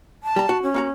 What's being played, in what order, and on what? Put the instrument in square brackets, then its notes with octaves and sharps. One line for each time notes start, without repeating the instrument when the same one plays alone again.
[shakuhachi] A5
[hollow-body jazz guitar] G3 A#5
F#4
[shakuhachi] C#4
[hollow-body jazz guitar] A#3 F#4 A#5